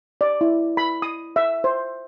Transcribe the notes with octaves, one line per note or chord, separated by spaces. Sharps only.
D5
E4
B5
D#6
E5
C5